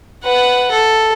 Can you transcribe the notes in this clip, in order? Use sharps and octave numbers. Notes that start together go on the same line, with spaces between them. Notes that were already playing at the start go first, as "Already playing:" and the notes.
B4 F#5
A4